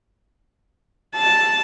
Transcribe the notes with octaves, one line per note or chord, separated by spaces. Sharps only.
A5